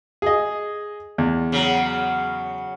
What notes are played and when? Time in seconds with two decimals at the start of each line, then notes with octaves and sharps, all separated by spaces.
0.22 G#4 D#5
1.18 E2
1.52 C#3 F#3